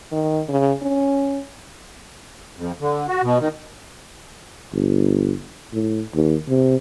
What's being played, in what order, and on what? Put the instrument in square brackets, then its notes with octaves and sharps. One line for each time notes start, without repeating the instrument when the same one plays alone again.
[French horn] D#3
C#3
C#4
[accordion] F2
D3
F#4
B2
D#3
[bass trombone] G1
A2
D#2
C3